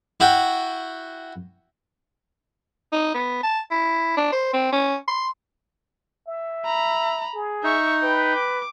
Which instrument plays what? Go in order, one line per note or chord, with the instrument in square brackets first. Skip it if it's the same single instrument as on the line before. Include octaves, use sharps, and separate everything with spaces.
[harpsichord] E4 F#4 G5
[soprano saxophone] D#4
B3
A5
E4
D4
C5
C4
C#4
C6
[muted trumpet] E5
[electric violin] A#5 B5
[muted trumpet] G#4
[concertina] D#4 [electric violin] E5 C#6
[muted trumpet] B4 [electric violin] G5
[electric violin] D6